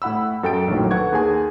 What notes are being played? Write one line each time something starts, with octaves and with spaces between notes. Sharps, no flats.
A2 E4 F#5 B5 E6
F#2 A4 G5 A6 D7
A#1 A2 D#3 F#3
A4 B4 F#5 C#6 G#6
D#2 G#4 G#5